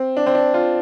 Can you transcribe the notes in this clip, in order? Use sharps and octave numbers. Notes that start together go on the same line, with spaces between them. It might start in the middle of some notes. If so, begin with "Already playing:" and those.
Already playing: C4
D4
C4
D4
F4